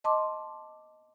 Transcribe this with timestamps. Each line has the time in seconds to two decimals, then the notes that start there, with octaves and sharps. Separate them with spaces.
0.04 D#5 A5 C6 D6